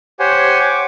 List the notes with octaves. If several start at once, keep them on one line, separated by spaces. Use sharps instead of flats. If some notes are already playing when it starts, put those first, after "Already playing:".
G4 C5 C#5 F#5 G#5
C#6 D6